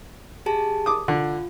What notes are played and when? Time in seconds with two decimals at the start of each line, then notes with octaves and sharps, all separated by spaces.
0.46 G4 G#4 A5
0.86 D6 D#6
1.08 D3 F4